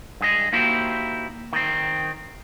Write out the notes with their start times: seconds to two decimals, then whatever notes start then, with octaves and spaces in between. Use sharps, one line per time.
0.21 G2 G#4 D#5
0.53 A#3 D#4 E4 F#4 G4 C5
1.53 D#3 C4